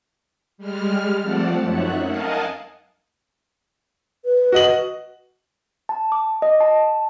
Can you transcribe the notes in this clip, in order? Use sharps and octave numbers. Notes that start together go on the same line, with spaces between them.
G3 G#3 F6
F3 A3 C4 D5 F#5 A5
F#2 D#4 C#5 E5 F#5 F#6
A#4 D#5 F5 F#5 G#5 A5
B4
F#4 D#5 F#7
A5
D6
D#5
A5